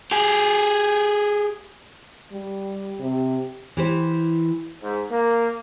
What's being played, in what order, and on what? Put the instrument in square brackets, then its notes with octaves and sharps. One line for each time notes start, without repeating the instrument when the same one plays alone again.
[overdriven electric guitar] G4 G#4
[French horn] G3
C3
[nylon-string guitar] E3 G4 C5
[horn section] G#2
A#3